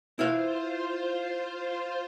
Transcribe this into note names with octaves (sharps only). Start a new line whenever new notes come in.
E4 F4 B4 C5 F5